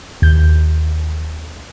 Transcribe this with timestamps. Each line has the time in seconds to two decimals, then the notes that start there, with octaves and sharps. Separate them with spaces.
0.22 D#2 G6